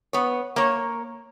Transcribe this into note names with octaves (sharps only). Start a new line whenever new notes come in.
B3 C#5
A#3 C#5